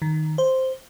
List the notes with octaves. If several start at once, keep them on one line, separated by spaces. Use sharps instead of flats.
D#3
C5